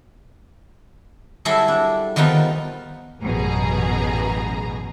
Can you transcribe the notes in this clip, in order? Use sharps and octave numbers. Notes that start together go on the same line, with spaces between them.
F#3 G3 E4 G#4 A4 E5
D4
D#3 F3 G3 B3 D#4
A1 F#2 B2 G#4 A#5